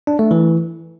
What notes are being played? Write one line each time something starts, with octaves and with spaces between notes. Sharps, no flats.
D4
A3
E3